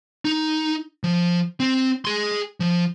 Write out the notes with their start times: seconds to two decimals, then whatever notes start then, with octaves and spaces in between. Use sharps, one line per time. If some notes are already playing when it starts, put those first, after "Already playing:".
0.25 D#4
1.04 F3
1.60 C4
2.05 G#4 C6
2.60 F3